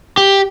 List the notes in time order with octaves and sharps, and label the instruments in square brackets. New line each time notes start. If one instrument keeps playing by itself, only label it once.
[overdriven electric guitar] G4